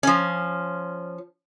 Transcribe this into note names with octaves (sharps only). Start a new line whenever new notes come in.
F3 C#4